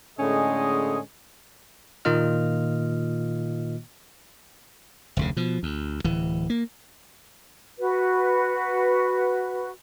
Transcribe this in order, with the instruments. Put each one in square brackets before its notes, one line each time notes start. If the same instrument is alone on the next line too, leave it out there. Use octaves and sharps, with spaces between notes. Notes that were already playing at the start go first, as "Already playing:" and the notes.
[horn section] A2 D3 G#3 C#4 G#4 D#5
[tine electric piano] A#2 D#3 A#3 F4 D#5 F6
[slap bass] F1 D2 C#3
B2 F3
D2
D1 E3
A#3
[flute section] F#4 B4